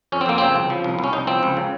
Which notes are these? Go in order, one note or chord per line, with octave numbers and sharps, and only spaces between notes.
F2 C#4
C4
F2 A#3
C#3 C4
C2
F3
C2
C2
C#4
C2 D#4
F3 C4
C#2
C#3